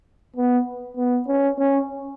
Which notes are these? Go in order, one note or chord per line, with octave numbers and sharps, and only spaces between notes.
B3
B3
C#4
C#4